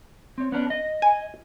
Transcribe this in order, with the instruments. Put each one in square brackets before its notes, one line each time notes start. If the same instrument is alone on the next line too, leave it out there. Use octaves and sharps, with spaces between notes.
[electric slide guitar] C4 C#5
B3 C#4 D4
D#5
[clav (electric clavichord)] G#5